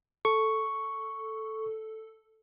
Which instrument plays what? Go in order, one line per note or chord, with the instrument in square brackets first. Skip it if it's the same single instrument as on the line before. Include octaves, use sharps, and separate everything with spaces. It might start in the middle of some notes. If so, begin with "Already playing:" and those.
[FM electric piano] A4 [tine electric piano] C#6